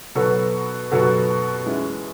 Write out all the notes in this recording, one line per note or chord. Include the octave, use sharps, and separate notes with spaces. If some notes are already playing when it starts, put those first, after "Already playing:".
B2 F#3 B3 F#4 A4
B2 F#3 B3 F#4 A4
E3 G#3 C#4